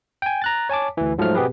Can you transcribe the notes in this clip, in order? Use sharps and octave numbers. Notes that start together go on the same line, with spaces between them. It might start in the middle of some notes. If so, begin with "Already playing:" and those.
G5 G#5
A#5 F#6 A6
C#5 G#5 A5 D6
D2 E3
G#2 F3 F#3 A3 F6
B2 B3 C4 G4 G#4 B4